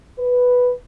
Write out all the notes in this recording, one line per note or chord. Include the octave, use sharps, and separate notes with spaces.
B4